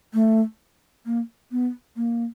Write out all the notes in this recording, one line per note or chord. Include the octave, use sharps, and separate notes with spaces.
A3
A#3
B3
A#3